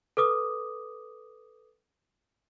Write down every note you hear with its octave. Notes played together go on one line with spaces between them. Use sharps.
A4 B4 D6 D#6